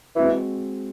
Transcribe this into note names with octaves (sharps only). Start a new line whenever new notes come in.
E3 G#3 C4 F#4